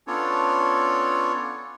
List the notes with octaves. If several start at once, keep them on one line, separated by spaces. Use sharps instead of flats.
B3 C#4 D4 F4 A4 C#5